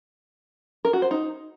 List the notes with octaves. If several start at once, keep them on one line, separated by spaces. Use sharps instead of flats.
A#4
F#4
C5
D#4